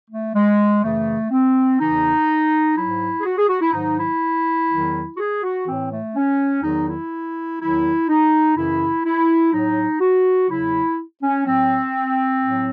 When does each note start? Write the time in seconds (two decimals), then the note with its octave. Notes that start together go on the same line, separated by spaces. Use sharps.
0.10 A3
0.35 G#3
0.84 F#2 C#3 E3 A3
1.31 C4
1.80 E2 C#3 E3 D#4
2.77 G#2 F#3 E4
3.20 G#4
3.25 F#4
3.37 G#4
3.49 F#4
3.61 E4
3.73 G#2 D#3 F#3 D#4
3.98 E4
4.70 E2 D#3 F#3
5.15 F#4
5.18 G#4
5.43 F#4
5.66 A2 E3 C4
5.91 A3
6.15 C#4
6.62 E2 D#3 F#3 D#4
6.88 E4
7.60 E2 D#3 F#3 E4
8.09 D#4
8.56 F#2 C#3 E3 E4
9.04 E4
9.52 A2 F#3 D#4
10.01 F#4
10.49 E2 C#3 F#3 E4
11.23 C#4
11.46 A2 F#3 C4
12.43 A2 F#3